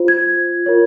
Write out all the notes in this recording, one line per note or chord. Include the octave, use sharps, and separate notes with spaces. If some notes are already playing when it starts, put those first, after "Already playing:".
Already playing: F4 C5
G#6
F4 A#4 C#5